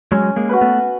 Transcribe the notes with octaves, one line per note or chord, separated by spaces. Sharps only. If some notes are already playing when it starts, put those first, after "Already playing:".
F#3 G#3 C#4
G#3 A#3
F#4 B4
A3 B3